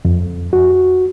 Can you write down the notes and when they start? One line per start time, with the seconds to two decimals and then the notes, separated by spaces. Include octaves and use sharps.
0.05 F2
0.53 F#4